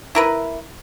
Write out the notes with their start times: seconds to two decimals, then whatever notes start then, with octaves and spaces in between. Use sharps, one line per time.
0.15 E4 A#4 B4